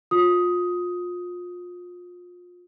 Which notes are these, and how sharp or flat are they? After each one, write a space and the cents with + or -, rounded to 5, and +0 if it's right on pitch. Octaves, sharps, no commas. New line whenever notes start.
F4 +30 D#6 +10